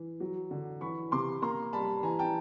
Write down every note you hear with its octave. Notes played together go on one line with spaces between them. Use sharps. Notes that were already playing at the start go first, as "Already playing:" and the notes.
Already playing: E3
F#3
D3
E3 B5 C#6
C3 C6 D6
A#3 A#5 C6
G3 A5 B5
E3 G#5 A#5
G5 A5